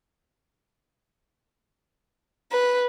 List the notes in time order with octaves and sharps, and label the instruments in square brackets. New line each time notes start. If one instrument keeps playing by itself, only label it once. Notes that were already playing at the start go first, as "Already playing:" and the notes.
[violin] B4